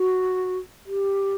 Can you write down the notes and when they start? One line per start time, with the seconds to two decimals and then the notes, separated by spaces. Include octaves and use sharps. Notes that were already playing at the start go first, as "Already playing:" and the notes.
Already playing: F#4
0.86 G4